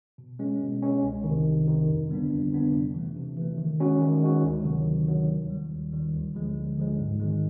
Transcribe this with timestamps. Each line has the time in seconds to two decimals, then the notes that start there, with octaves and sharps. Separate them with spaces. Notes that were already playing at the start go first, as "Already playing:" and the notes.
0.18 B2
0.39 G#3 C#4
0.61 B2
0.82 G#3 C#4
1.03 C2
1.24 C3 D#3
1.45 C2
1.67 C3 D#3
1.88 F2
2.09 D3 G3 B3 D4
2.31 F2
2.52 D3 G3 B3 D4
2.73 C3
2.94 E3 A3
3.16 C3
3.37 E3 A3
3.58 D#3
3.80 G#3 C#4 F#4
4.01 D#3
4.22 G#3 C#4 F#4
4.44 D2
4.65 C3 D#3 F#3
4.86 D2
5.08 C3 D#3 F#3
5.29 D#2
5.50 D#3 G3
5.71 D#2
5.93 D#3 G3
6.14 D2
6.35 D3 F3 G#3
6.56 D2
6.78 D3 F3 G#3
6.99 G#2
7.20 D#3 G#3